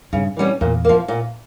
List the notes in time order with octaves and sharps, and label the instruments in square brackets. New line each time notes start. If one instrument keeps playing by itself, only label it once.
[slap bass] G2 [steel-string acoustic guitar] C#3
[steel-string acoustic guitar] E3 G3 C#4
[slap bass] E2 [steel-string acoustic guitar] A#2
[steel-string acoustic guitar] F3 A#3
A#2